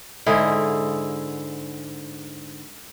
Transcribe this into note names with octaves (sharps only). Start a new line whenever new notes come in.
G#2 D3 E4 G#4